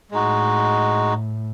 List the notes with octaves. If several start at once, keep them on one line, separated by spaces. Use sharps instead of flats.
A2 G#3 D#4 F#4